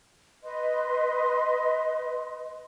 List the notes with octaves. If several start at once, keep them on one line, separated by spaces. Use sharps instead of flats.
B4 D#5 C6